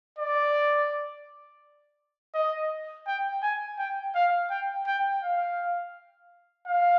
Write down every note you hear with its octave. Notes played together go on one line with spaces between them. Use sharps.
D5
D#5
G5
G#5
G5
F5
G5
G5
F5
F5